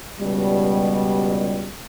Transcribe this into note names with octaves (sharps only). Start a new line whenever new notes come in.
C#2 B2 G3